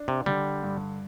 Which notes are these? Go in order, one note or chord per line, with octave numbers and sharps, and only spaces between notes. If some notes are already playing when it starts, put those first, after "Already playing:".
Already playing: D4
C3
D3 G3
G2